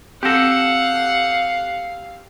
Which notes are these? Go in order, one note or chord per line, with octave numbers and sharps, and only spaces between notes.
C4 G4 A4 F5 F#5 A#6